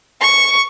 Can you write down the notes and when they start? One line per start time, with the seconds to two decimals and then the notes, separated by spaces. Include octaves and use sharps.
0.20 C#6